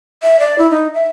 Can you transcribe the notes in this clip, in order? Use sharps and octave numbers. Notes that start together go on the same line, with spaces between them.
E5
D5
E4
D#4
E5